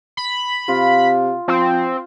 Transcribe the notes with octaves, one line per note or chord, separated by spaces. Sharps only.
B5
C3 F4
F3 C4